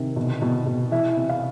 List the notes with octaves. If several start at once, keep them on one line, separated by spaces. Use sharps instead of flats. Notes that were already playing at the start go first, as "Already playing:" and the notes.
Already playing: C3 D#3
B2
B2
B2
E3 E5
C3
F5